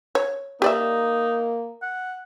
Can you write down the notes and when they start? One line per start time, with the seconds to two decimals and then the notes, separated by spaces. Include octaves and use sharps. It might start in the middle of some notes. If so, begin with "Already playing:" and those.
0.15 C#5
0.62 A#3 D#4 G4 D5 E5
1.82 F#5